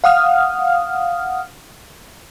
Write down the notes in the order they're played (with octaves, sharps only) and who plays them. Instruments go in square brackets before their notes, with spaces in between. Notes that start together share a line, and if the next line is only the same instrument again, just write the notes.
[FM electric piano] F5 F#5 D#6 F6